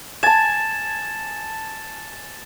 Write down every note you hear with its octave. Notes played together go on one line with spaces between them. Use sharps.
G#5 A5 A6 E7